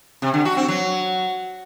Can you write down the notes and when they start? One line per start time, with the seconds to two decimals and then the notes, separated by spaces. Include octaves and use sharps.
0.22 C3
0.34 D3
0.45 F#4
0.57 C4
0.68 F#3